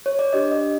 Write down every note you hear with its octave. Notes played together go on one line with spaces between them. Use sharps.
C#5
D5
D4 G4 D#5
D#5